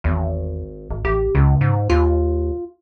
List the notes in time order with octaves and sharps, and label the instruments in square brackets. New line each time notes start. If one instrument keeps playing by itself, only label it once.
[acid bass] G#1 [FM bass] E2
[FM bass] G#1
[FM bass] A1 [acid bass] G4
[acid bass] C#2 [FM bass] C#3
[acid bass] G#2
[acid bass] D#2 [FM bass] F4